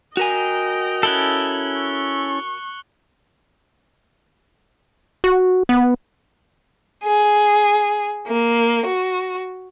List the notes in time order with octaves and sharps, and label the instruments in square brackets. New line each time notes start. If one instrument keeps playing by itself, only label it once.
[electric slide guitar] F#4 A#4 G#5 [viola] D#5 G5 [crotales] F7
[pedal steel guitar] C#4 E4 A4 [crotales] F#6 F#7 G7
[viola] C#6
[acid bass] F#4
B3
[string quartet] G#4
A#3
F#4